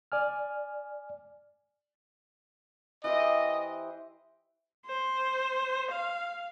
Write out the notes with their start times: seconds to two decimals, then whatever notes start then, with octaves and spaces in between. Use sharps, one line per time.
0.12 D5 G#5 F6
3.04 E3 G4 C5 D#5
4.86 C5
5.91 F5